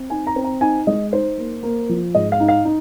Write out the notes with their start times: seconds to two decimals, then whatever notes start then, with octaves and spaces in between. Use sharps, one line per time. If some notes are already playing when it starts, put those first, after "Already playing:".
Already playing: C4
0.10 D#4 G#5
0.27 A#5
0.36 C4
0.44 A#5
0.61 D#4 G#5
0.87 G#3 D#5
1.13 D#4 C5
1.38 A#3
1.63 A#3
1.89 F3
2.15 G#2 D#5
2.32 F5
2.40 D#4
2.48 F5
2.65 D#4